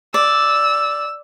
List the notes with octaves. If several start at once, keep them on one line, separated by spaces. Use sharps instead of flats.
D5 E6